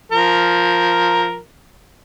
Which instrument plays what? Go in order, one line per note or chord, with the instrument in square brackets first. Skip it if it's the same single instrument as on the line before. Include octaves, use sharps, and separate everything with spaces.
[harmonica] F3 A#4